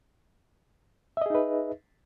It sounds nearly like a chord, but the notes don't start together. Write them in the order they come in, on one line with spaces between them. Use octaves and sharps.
E5 D#5 G#4 D#4 B4